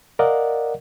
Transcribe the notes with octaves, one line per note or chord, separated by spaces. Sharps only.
A#4 D5 D#5 F5 F#5